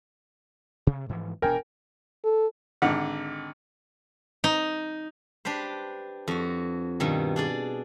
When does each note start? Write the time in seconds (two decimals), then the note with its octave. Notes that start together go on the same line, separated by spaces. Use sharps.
0.87 C3
1.09 G#2 E3 F3
1.42 E1 B2 D4 A#4 G5 G#5
2.24 A4
2.82 G#1 D3 F#5
4.44 D#4
5.45 D4 G4 B4 C5
6.28 F2 F#4
7.00 G2 B2 D#3
7.36 D4 G#4 D5